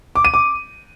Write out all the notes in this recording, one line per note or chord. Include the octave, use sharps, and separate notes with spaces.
D6
D#7
D6